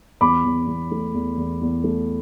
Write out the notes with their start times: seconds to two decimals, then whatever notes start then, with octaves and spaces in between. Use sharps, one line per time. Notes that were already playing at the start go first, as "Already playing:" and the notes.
0.21 E2 B5 D6
0.45 E2
0.67 E2
0.91 A3
1.14 E2
1.37 E2
1.61 E2
1.84 A3